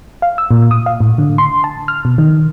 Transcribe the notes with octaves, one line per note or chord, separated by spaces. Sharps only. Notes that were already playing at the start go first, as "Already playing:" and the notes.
F5
E6
A#2
D#6
F5
A2
D3
C6
A5
F6
B2
D#3